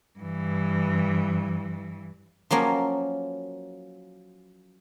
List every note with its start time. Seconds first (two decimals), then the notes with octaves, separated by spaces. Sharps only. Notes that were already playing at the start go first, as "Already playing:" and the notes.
0.19 G2 E3
2.51 F3 F#3 A#3 C#4